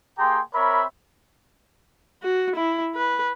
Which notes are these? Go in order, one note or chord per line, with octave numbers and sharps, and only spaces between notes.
A#3 G4 G#4 G5 A#5 C6
C4 A#4 C#5 E5 B5
F#4
E4
B4